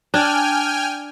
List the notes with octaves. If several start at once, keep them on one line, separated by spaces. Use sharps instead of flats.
D4 G5 G#5 F6